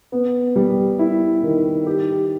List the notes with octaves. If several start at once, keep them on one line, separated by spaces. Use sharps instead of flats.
B3
G3
E4
D#3
G4